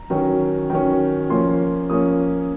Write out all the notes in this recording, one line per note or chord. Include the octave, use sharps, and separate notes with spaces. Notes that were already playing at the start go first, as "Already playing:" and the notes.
Already playing: A#5
D#3 F#3 C#4
D#3 F#3 C#4
F3 A#3 C#4 C6
F3 A#3 C#4 D#6